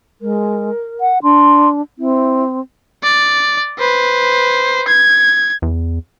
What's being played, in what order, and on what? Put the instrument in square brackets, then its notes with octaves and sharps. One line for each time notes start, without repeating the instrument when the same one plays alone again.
[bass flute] G#3 [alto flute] A#4
[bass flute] F#5
[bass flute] D4 [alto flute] C6
[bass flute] C4 [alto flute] E4
[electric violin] D5
B4 C5
G#6
[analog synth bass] E2